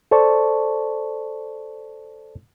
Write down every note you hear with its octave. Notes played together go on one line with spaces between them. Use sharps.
A4 C5 D5 A5 C#6